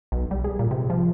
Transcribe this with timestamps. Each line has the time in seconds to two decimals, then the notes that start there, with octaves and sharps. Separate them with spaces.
0.12 B1
0.31 G3
0.44 G#4
0.59 A#2
0.71 C3
0.90 F3